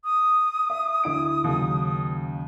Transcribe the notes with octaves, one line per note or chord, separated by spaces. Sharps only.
D#6
E5
D2 E4 D7
D#2 C#3 F#3